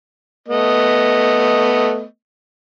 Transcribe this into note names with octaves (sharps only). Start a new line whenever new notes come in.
A3 B3 D#5